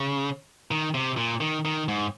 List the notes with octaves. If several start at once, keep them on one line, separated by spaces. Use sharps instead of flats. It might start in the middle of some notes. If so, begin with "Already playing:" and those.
Already playing: C#3
D#3
C3
A#2
D#3
D#3
G#2